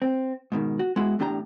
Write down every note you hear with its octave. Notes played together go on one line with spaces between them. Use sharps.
C4
G#2 B2 D#3
F#4
G#3 B3 E4 F#4
E2 A2 D4 G4 G5 A#5